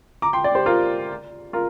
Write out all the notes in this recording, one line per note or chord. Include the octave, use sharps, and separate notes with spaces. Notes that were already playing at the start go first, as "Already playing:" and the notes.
A#5 D6
G5 C6
D5 G5
G4 C5
F4 A#4
F4 A#4